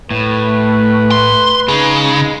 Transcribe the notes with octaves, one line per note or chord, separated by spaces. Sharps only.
A2 A3 B4
C6
C#3 G#3 D#4